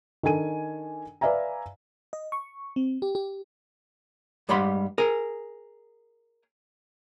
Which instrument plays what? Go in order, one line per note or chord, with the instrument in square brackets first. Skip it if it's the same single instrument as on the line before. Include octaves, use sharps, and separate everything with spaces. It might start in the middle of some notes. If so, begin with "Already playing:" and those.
[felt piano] D#3 D4 A4 G#5 D#7
B4 D5 E5 F5 G#5 A#5
[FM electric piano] D#5
C#6
C4
G4
G4
[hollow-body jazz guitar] G2 G3 G#3 F#5 B5 C6
G#4 A#4 G#5